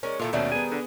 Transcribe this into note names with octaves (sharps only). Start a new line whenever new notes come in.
G#3 C#4 A#4 D5
A#2 D#3 E4 F4 A4
D#2 B2 D#3 G3 A3 C#4 D4
B3 G#4 G#5
D3